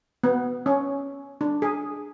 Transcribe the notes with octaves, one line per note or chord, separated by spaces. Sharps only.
B3
C#4
D4
G#4